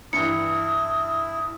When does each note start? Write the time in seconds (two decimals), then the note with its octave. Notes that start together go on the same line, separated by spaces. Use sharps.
0.13 G2 E3 E4 D#6 C#7